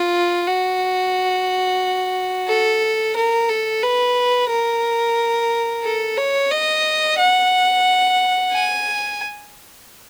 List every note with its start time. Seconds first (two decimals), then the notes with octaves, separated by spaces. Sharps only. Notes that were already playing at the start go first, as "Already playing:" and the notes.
Already playing: F4
0.48 F#4
2.49 A4
3.16 A#4
3.49 A4
3.83 B4
4.50 A#4
5.84 A4
6.18 C#5
6.51 D#5
7.18 F#5
8.53 G#5